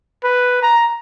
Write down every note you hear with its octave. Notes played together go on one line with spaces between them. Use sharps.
B4
A#5